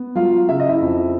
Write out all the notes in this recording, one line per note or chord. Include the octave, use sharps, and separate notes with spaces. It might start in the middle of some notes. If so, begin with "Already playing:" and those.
Already playing: B3
F#3 F4 F5
C#3 E5
D#5
E4 E5
F2